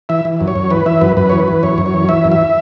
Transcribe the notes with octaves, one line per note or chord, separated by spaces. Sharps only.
E3 E5
E3
F#2
C#5
F#2
E3 B4
E3 E5
F#2 B4
F#2 B4
E3 C#5
B4
E3
F#2 C#5
F#2
C#5
E3
E3 E5
F#2
E5